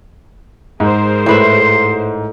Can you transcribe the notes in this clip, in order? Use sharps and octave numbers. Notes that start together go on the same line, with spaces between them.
G#2 G#4 A#4 C5
A2 B4 E5 C6